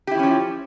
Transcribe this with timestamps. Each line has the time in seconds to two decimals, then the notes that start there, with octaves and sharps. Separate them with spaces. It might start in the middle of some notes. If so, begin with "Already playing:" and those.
0.07 G4
0.11 E4
0.15 E3
0.19 C#4
0.23 F3